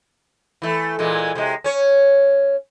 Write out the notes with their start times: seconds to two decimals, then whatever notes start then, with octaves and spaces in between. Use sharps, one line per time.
0.62 E3 A3
0.99 A#2 E3 G#3
1.35 C3 G#3
1.64 C#4 C#5